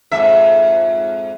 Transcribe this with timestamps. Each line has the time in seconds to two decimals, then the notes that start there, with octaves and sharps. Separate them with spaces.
0.12 F2 G#2 E5